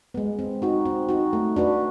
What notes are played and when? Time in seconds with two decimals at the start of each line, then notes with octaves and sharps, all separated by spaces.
0.14 G#3 B3
0.39 C4
0.62 D#4 F#4
0.85 C4
1.09 D#4 F#4
1.33 A3
1.56 D4 F#4 B4